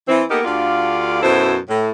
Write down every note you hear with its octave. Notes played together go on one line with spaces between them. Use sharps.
E3 C4
A#3 B3 D#4 G4 A4 A#4
D2 D3 F4 G4 D5 F5
F#2 B2 E4 A4 C5
A2